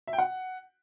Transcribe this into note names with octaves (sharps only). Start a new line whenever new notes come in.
E5
G5
F#5